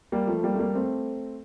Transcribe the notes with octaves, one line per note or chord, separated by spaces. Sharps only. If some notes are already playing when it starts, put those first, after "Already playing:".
G3 A#3
F3 A3
G3 A#3
A3
G3 A#3
A3 C4